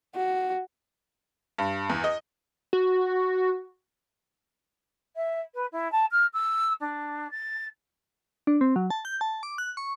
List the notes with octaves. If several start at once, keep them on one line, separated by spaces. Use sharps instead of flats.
F#4
G2
E2
D#5
F#4
E5
B4
E4
A5
F6
E6
D4
A6
D4
C4
F#3
A5
G6
A5
D6
F#6
C#6